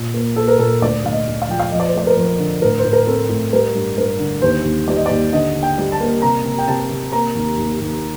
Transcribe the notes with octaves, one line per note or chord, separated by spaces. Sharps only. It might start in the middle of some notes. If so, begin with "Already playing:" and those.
Already playing: A#2
A#3
A#3 A4
A#4
A#2 A4
D2 D5
D2 F5
D#5
D2
F5
F3 G5
F5
F2 D#5
D5
C5
A3 D5
A#4
F2 C5
D3
A2 A#4
C5
A2
A#4
C4 A4
A2
G3 A#4
G2
G2 A#4
D3
D#2 C5
D#2
G3 D5
D#5
D#2 D5
D3 D#5
D3
G5
G3
A5
A#3
C3 A#5
C3
G5
C3 A5
C3
A#3 A#5
D#2
D#2
D#2